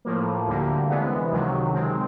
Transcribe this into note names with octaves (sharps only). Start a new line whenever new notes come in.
A2 F3 A#3
D2 D3 G3 A#3
C3 E3 G#3 B3
C#2 C3 D#3 F#3
D#3 G#3 C4